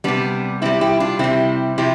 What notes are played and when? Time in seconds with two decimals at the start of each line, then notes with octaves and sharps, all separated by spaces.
0.04 C3 G3 B3 D4
0.62 C3 G3 C4 E4
0.81 E4 G4
1.00 D4 F4
1.19 C3 G3 C4 E4
1.78 C3 F3 E4 G4